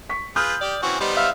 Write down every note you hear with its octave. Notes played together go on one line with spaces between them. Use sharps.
C#6 B6
F4 G#4 B4 D#6 F6 G6
G4 D5
E3 C4 C#4 F#4
G3 B3 D#4 C5
E5 F5